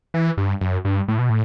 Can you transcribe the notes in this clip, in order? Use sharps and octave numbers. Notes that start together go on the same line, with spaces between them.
E3
G2
F#2
G2
A2
B2
A2